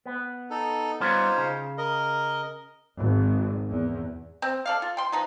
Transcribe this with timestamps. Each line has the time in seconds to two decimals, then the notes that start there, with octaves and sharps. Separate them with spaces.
0.06 B3
0.50 D#4 A4
1.00 G3 B3 C#4 D#4 F4 C5
1.38 C#3
1.78 A#4 D#5
2.98 G#1
3.70 E2
4.42 C4
4.66 A4 D5 F5
4.82 F4
4.97 G5 C6
5.12 F3 D#4 B4